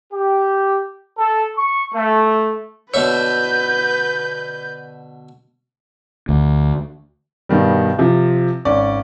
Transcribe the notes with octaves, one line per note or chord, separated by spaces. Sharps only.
G4
A4
C#6
A3
B2 D3 B4 C#5 E5 G6
D2
G2 B2 D#3 G3
C3 F3
G#1 C#4 D5